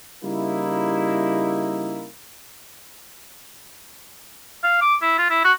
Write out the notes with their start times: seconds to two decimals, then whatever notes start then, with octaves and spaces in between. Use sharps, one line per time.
0.23 C#3 G3 A#3 D#4 E4
4.63 F5
4.81 D6
5.02 E4
5.18 F4
5.30 E4
5.44 F#4